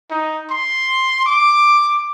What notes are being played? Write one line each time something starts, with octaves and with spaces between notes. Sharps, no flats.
D#4
C6
D6